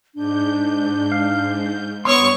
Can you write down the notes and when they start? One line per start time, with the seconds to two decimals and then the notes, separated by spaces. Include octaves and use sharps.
0.15 G#2 D4 G6
1.12 F5
2.05 G2 B3 C#5 C6 C#6 D#6 E6